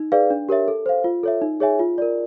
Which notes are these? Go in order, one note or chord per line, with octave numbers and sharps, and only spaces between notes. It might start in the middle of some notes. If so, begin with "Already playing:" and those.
Already playing: D#4
G#4 B4 D5 F5
D4
G4 A#4 C#5 E5
A4
C5 F5
F4
A4 C#5 E5
D#4
G#4 C#5 E5 G#5
F4
A#4 D5